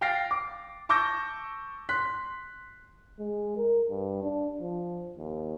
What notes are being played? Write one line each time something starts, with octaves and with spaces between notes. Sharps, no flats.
F5 G5 F6 A6 A#6 C7
D6
A5 C#6 D6 E6 G6 A#6
C6 F#6 B6
G#3
A#4
G2
D4
F3
D#2